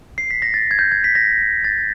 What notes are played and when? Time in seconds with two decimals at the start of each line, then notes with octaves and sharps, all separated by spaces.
0.18 C7
0.31 B6
0.42 A#6
0.54 A6
0.71 G#6
0.79 G6
0.92 G#6
1.04 B6
1.15 A#6
1.64 A6